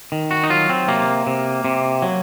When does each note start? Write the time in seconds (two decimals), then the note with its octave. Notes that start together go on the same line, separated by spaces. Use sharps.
0.12 D#3
0.31 F#4
0.43 D#4
0.50 F#3 F4
0.69 C4
0.88 C3 A#3
1.27 C3
1.65 C3
2.02 F#3